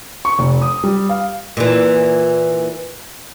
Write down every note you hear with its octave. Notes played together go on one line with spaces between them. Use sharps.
C#6
F1
D#6
G3
F5
A#2 E3